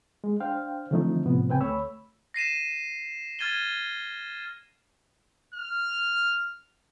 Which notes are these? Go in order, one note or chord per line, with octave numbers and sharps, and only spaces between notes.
G#3
D4 C5 F5 G5
D3 E3 F3 A3 C4 D#4
A2 C3 F3 B3
C#3 C4 B4 G5 G#5
D2 A3 C#5 B5 E6
A#6 C7 D#7 E7
F6 G#6 A6 D#7 G7
F6